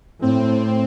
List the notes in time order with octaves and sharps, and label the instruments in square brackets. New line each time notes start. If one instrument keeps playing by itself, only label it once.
[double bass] A2 [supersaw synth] C4